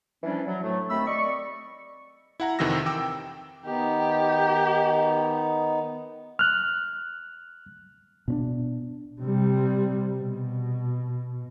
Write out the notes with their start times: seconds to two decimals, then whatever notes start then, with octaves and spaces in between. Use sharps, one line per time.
0.23 E3 F3 G3 C#4 D4
0.47 F#3
0.63 A2 F#3 A3
0.90 D#2 A3 C4 B5 E6
1.07 D5 D#5 C#6
2.40 E4 F#5 A#5
2.59 F2 C3 D#3 E3 E6 A#6
2.86 G5 D6 E6
3.66 D#3 B3 D#4 G4
6.39 F6 F#6
8.28 B2 C#4 D4
9.22 C3 G3
10.17 B2